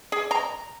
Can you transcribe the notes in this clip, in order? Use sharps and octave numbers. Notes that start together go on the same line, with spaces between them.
G#4
A#5